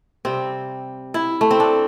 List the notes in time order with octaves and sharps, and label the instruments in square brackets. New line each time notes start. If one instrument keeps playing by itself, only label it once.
[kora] C3 G3 C4
E4
A3
C4
D4